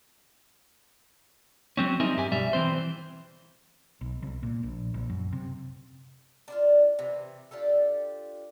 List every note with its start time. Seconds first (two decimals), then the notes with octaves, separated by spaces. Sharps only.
1.77 F#3 C4 C#4
2.00 G3 C4 D#4 A#4 E5 G#5
2.16 G2 G4 G#5
2.32 B1 G3 E5
2.53 E3 C4 C5
4.01 B1
4.23 C2
4.43 A#2
4.63 A#1
4.94 A#1
5.10 F#2
5.33 C3
6.48 D4 E4 F4
6.99 C3 E3
7.51 D4 F4 G4 A4